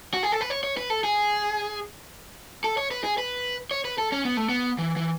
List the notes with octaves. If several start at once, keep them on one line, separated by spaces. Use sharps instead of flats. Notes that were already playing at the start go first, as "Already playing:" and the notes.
F#4
G#4
A4
B4
C#5
C#5
B4
A4
G#4
A4
C#5
B4
G#4
B4
C#5
B4
A4
C#4
B3
A3
B3
E3
E3